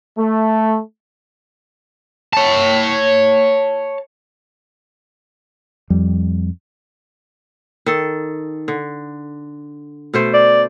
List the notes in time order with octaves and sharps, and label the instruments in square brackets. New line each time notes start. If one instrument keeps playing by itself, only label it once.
[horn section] A3
[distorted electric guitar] C#5 A5
[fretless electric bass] F2 G3
[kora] D#3 A4
D3
B2 A3 C5
[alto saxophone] D5